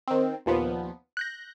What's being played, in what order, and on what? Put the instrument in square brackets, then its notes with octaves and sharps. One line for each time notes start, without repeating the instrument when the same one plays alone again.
[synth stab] D#3 C4
D#2 A#2 F3 B3
F#6 G6 A#6